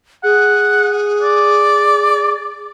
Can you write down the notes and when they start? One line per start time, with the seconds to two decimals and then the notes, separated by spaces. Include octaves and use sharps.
0.24 G#4 F#5
1.22 D5